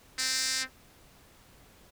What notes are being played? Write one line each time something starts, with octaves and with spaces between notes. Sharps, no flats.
C4